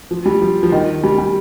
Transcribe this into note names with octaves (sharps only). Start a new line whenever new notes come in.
F3
G3
F3
F3
D#3
G3
G3